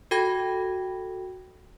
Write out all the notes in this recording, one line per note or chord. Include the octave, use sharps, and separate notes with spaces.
F#4 A4 G5 B5 G#6 A#6